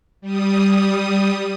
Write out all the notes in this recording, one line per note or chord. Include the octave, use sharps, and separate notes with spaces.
G3 D#6